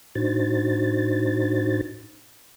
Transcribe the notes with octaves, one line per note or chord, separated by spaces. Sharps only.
A2 D4 D#4 F#4 C5 A6